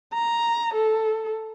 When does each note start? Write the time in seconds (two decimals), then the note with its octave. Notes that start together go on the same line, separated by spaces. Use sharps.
0.14 A#5
0.74 A4